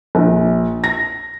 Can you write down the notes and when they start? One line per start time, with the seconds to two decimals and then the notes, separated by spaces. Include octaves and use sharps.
0.15 A#1
0.84 A#6